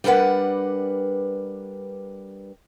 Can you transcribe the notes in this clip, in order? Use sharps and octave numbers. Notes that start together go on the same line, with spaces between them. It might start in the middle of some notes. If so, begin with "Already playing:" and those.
G3 D4 A#4 B4 F#5